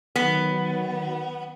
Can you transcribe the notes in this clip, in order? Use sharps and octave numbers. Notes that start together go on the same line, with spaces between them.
D#3 F#3 B3